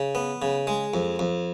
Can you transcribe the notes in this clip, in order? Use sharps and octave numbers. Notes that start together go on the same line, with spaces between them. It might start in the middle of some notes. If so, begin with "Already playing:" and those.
Already playing: C#3
B3
C#3
G#3
F2
F2